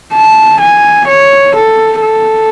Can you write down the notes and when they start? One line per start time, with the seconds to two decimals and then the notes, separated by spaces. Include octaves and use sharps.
0.14 A5
0.60 G#5
1.08 C#5
1.55 A4
2.02 A4